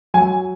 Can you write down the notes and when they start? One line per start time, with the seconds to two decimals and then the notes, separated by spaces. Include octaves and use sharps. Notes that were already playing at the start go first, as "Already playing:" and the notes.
0.14 F#3 G#5